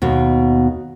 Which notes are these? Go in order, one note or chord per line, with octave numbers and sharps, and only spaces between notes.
D#2 B2